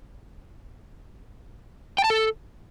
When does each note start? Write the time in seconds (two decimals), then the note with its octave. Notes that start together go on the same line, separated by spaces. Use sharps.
1.98 G5
2.04 A5
2.10 A4